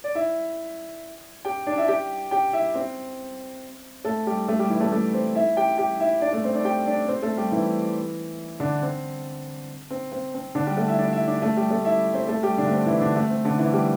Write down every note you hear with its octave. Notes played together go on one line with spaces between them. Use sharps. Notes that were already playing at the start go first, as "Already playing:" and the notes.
D5
E4 E5
G4 G5
D4 D5
E4 E5
G4 G5
G4 G5
E4 E5
C4 C5
A3 A4
G3 G4
A3 A4
G3 G4
E3 E4
A3 A4
A3 A4
C4 C5
E4 E5
G4 G5
G4 G5
E4 E5
D4 D5
A3 A4
C4 C5
D4 D5
G4 G5
D4 D5
C4 C5
A3 A4
G3 G4
E3 E4
D3 D4
C4
C4
C4
C4
D3 D4
G3 G4
A3 A4
E4 E5
D4 D5
E4 E5
D4 D5
A3 A4
G3 G4
A3 A4
E4 E5
C4 C5
A3 A4
G3 G4
D3 D4
A3
C4
E3 E4
D3 D4
A3
C4
D3 D4
E3 E4
G3 G4